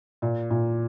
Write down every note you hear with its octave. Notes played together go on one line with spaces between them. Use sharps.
A#2
A#2